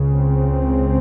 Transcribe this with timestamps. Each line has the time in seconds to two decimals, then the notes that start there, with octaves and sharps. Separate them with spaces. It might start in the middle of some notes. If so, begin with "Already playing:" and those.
Already playing: C#2 C#3
0.12 C4